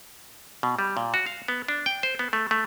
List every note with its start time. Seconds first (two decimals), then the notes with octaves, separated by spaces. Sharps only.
0.63 B2
0.79 G3
0.97 A#2
1.14 F#4
1.26 F5
1.48 B3
1.68 D4
1.86 G5
2.03 C5
2.19 B3
2.33 A3
2.51 A3